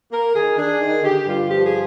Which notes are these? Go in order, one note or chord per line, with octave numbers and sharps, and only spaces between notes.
A#3 A#4
D#3 G#4
D4 G#4
D#3
D3 G4
G2 F4
F3 G4
G#4